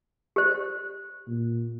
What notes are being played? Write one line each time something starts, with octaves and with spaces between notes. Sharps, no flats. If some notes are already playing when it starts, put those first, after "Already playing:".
G4 C5
A#2